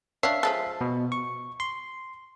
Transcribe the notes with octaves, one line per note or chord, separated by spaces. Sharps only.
D4 C#5 E5 F5 C7
F3 G#3 A4
B2
C#6
C6